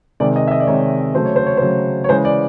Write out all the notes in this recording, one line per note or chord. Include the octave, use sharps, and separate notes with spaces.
C3 D#3 G#3 D5
D#5
E5
D#5
D5
C3 D#3 G#3 C#5
C#3 F#3 A3 C5
C#5
C5
C#5
C#3 F#3 A3 C5
C#5
C#3 E3 G#3 C5
D5